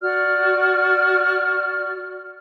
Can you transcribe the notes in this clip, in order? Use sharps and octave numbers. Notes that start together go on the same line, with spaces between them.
F#4 D5 F6